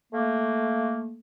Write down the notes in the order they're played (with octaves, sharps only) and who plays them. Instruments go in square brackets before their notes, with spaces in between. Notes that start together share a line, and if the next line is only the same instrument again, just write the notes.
[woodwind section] A3 A#3